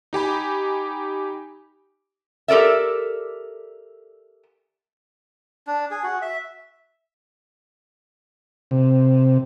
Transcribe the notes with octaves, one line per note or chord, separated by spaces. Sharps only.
D#4 G4 G#5 B5
G4 A4 A#4 D5 E5
D4
G#4
F#4
E5
C3